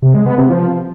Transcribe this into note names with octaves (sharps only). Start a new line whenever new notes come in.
C3
G#3
B3
C3
F3